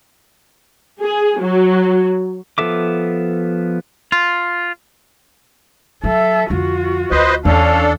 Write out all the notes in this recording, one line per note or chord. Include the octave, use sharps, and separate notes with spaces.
G#4
F#3
F3 B3 A4 E5 D6
F4
F#3 A4 E5
F2 D3 F4 F#4
D2 B4 C5 D#5
E2 C#4 D4 A4 F5